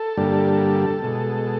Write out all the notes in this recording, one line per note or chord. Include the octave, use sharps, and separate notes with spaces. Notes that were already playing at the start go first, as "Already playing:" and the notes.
Already playing: A4
G2 D3 G3 A#3
B2 G#3